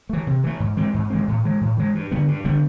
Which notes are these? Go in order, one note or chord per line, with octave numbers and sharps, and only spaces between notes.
E3 A3
C3
E3 A3
G#2
E3 G#3 C4
G#2
E3 G#3 C4
A2
E3 G#3
A2
E3 G#3
G2
D3 G3 B3
G2
D3 G3 B3